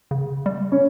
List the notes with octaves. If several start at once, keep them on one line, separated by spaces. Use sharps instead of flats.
C#3
G3
C#4